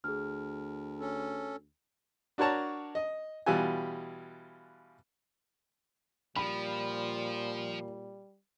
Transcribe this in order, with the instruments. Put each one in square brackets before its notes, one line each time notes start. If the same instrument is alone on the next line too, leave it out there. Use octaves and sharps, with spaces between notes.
[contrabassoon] D2 [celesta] G#4 F6
[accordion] C#4 A4
[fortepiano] D4 F#4 A#4 C#5 A5 A#5
D#5
B2 E3 G3 F4 G4 G#5
[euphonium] A#2 [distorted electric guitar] F3 [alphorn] G3 [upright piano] B5